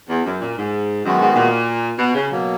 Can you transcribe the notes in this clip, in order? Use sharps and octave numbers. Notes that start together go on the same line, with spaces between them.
E2
F#2
A#2
G#2
F#2 D#3 G#3 B3 F#4
G#2
A#2
B2
C#3
B2 F#3 A#3